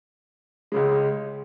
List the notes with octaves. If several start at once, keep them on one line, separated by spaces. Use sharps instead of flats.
C#2 C#3 G#3